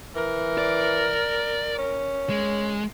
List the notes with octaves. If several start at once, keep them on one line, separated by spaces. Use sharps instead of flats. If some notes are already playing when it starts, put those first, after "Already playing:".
E3 A#4
D5
C#4
G#3